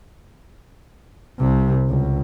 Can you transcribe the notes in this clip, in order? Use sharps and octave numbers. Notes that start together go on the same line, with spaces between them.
C2 C3
C#2